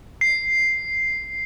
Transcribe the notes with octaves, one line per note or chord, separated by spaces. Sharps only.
C7